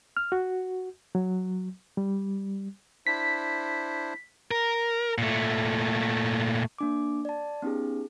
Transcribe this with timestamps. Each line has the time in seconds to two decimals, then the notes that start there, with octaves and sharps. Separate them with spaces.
0.17 F6
0.32 F#4
1.15 F#3
1.97 G3
3.07 D4 E4 C5 B6
4.51 A#4
5.18 A#2 A3
6.78 A#3 D4 D6
7.25 D5 A5
7.62 B3 C#4 D#4 G4 G#4